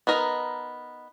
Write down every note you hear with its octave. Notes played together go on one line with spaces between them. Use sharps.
B3 D#4 A#4 D#5